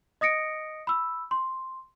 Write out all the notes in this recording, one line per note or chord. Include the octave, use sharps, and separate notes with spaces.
D#5 D#6 A#6 C#7 D7
B5 E6
C6